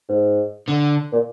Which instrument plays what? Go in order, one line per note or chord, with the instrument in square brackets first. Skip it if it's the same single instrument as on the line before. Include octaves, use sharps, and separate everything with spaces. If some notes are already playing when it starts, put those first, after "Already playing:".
[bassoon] G#2
[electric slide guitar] D3
[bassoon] A#2